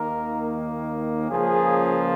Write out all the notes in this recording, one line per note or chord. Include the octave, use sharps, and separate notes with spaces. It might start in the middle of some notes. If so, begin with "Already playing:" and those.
Already playing: D#2 D#3 A#3 A#4
C#2 C#3 F3 A#3 G#4